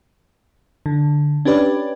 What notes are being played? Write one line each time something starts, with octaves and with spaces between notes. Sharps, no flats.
D3
C#4 D4 G4 B4 D5